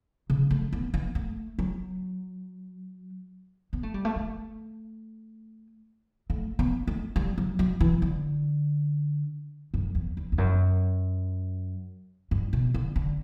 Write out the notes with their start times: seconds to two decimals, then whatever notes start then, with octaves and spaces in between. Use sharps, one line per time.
0.30 C#3
0.51 A3
0.73 B3
0.94 B3
1.15 A3
1.59 F#3
3.73 B3
3.83 A3
3.94 G3
4.05 A3
4.16 A3
6.30 A3
6.59 B3
6.87 A3
7.16 G3
7.38 F#3
7.59 F#3
7.81 E3
8.02 D3
9.74 F#2
9.95 E2
10.17 E2
10.32 E2
10.38 F#2
12.31 G2
12.53 B2
12.74 D3
12.96 D3